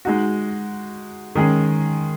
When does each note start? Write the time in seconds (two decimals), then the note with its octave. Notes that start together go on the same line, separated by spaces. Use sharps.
0.05 G#3 D#4 F#4
1.35 D#3 G#3 C#4 G#4